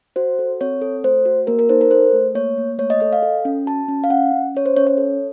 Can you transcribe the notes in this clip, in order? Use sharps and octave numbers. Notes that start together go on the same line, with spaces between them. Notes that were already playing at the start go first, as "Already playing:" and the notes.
F#4 C5
A4
C4 C#5
A4
A3 C5
F#4
A#3 A#4
A#4
D#4 C5
A#4
A4 C5
A3
A#3 C#5
A#3
A3 C#5
D#5
A4 D#5
F5
A4
C#4
F#4 A5
C#4
F5
C#4 F#5
C#4
C#4 C#5
C5
C#4 C#5
C#5
A4